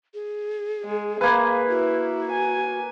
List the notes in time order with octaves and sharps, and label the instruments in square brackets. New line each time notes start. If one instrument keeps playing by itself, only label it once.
[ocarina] G#4
[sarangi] G#3
[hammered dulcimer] A#3 B4 [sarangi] G#4 [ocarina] F5
[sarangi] E4 [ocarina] F#4
[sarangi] G#5